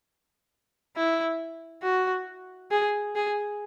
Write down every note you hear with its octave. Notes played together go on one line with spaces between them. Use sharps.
E4
F#4
G#4
G#4